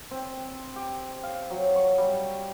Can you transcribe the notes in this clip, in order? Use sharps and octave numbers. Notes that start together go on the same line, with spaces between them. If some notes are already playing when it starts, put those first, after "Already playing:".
C4
G4
F5
F#3
C#6
G3